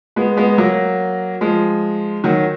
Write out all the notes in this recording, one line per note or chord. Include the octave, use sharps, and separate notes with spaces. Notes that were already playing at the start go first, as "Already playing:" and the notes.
G#3 B3
G#3 B3
F#3 A#3
F3 G#3
D#3 F#3